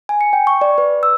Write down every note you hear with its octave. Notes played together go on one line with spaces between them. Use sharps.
G#5
C#7
G5
C#6
D5
B4
E6